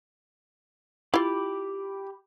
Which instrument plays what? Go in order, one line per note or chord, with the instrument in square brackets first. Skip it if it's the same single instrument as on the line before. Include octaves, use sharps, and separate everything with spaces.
[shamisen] E4 F4 [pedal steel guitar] G4 B5 D6